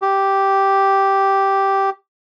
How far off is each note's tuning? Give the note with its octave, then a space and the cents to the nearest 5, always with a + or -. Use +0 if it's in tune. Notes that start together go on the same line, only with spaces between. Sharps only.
G4 -5